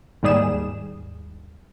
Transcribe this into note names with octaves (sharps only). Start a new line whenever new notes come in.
D#2 G#2 G3 G#4 E7